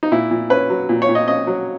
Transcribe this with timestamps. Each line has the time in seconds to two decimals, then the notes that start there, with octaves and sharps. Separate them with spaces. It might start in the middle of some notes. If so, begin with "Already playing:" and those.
0.03 D#4
0.12 A#2 E4
0.31 A#2
0.50 C#4 B4
0.70 F#3
0.89 A#2
1.02 C#5
1.09 A#2
1.15 D#5
1.28 C#4 D#5
1.47 F#3